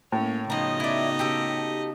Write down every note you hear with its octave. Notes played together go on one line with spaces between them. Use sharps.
A2 A#3 C#4 C#5
C#3 F3 B3 D#4 F#4 D#5 A#5
E4 D5
G4 A4